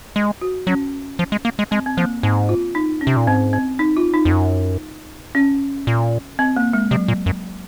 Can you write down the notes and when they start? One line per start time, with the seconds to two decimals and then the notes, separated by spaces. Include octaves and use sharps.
0.16 G#3
0.41 F#4
0.67 F#3 C#4
1.19 F3
1.32 G#3
1.45 A#3
1.59 G#3
1.71 G#3 C4
1.86 C4
1.97 F3 A#3
2.23 G#2 C4
2.49 F4
2.75 D#4
3.01 C#4
3.07 C3
3.17 A#2
3.27 G#2 C4
3.53 C4
3.79 D#4
3.97 F4
4.14 D#4
4.25 F2
4.31 F#2
5.35 C#4
5.87 A#2
6.39 C4
6.57 A#3
6.73 G#3
6.91 C3 F#3
7.08 A#2
7.26 F#2